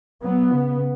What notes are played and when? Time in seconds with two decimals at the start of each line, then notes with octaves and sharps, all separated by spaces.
0.23 F#3 B3
0.53 C#3